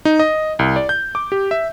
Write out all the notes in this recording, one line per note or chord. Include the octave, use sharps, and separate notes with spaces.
D#4
D#5
C2
D5
G6
D6
G4
E5